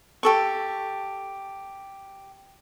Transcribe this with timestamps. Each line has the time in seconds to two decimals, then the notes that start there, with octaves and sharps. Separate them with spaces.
0.23 G4 A4 C#6